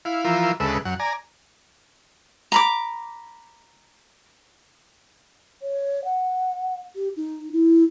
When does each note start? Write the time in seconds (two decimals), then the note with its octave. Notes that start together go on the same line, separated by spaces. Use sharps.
0.05 E4 F5
0.25 E3 F3 F4 A#4 E5
0.60 D2 C#3 G#3 A4 B4 E5
0.85 F#2 F#5
1.00 D5 G#5 A#5
2.52 A#5 B5 D6
5.62 C#5
6.05 F#5
6.96 G4
7.17 D#4
7.52 E4